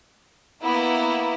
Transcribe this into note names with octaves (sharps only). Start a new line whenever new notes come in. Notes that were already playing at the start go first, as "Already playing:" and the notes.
A#3 B3 E4